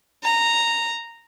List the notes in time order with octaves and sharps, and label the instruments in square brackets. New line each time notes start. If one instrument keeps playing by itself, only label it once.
[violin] A#5